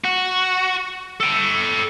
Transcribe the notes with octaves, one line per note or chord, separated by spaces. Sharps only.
F#4
A4 G5